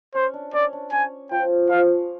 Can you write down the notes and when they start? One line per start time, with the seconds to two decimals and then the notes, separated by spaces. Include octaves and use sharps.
0.15 C#4 C5
0.34 D4
0.53 C#4 D5
0.73 D4
0.92 C#4 G#5
1.31 F3 F4 G5
1.70 F3 F4 F5